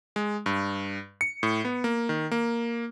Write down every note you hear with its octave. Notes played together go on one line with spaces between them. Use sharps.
G#3
G2
C#7
A2
B3
A#3
D#3
A#3